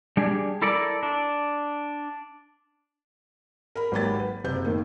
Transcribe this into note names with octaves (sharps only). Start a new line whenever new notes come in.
G3 D4 G4 G#4
E4 A4 A#4 D5
D4
A#4 B5
G#1 F#3 A#3 G4 B5 A6
B4
F#1 C3 G6
A2 D#3 A#3